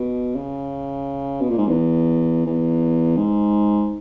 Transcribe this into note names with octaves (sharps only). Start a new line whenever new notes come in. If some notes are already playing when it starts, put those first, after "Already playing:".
Already playing: B2
C#3
B2
A#2
G#2
E2
E2
G#2